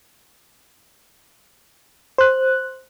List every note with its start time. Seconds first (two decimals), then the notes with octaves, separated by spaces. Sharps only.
2.18 C5 F#6